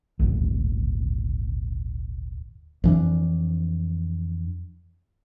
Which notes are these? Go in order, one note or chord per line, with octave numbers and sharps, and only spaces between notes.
D#1 G#1 D2
F2 E3 D4